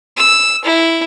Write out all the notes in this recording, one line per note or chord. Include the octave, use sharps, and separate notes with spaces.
E6
E4